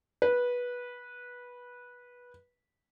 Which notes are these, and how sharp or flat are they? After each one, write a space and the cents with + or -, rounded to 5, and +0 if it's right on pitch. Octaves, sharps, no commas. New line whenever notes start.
B4 -15